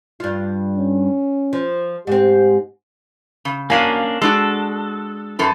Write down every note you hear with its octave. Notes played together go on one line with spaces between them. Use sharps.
G2 F4
C#4
F3
G#2 C4 G4
C#3
F#3 A#3 C#4 D4 F5 G#5
G#3 D4 F#4 A4
F#2 A4 B4